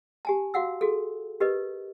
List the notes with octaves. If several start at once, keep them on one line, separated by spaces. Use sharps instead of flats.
G4 G#5 A5
F#4 F5 F#5 E6
F#4 G#4 A4
G4 A#4 B4 D#5